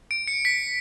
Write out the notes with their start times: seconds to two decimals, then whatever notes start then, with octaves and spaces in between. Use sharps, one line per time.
0.11 D7
0.27 C#7
0.45 B6